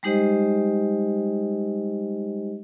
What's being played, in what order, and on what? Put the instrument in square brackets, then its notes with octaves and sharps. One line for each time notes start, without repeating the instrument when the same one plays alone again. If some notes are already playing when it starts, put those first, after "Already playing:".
[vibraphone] G3 G#3 D#4 G4 C5 D#5